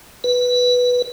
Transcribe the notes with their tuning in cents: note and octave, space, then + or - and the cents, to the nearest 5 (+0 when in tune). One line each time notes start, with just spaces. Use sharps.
B4 -5